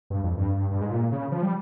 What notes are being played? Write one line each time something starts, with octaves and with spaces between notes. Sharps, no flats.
G2
F2
G2
G2
G#2
A#2
C#3
F3
G3